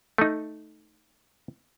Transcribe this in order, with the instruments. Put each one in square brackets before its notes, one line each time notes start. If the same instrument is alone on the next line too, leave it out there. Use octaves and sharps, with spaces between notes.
[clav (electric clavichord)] A3 D#4